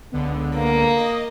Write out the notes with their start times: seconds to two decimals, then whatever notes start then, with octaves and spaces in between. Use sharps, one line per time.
0.12 C#2 D3 B3
0.56 A#3
0.96 D#5